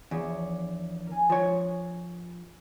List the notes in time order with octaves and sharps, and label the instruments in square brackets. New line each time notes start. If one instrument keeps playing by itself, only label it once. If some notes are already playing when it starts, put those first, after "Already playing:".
[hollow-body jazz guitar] E2 [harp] F3 D4 C#5
[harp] A#4 G#5
[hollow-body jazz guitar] F3 C#5